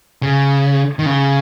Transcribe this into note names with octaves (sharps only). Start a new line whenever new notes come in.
C#3
D#3
C#3